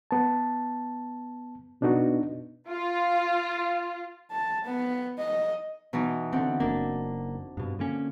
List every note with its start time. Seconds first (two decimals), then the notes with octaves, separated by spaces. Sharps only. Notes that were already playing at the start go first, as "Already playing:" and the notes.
0.11 B3 A5
1.82 B2 D4 D#4 F#4
2.70 F4
4.31 A5
4.65 B3
5.18 D#5
5.93 B2 E3 D#4
6.33 D3 E3 C4 F#5
6.60 F#1 A#3 D4
7.57 G2 B2
7.79 D3 A#3 C#4